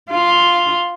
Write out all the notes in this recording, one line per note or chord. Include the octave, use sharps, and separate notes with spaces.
F4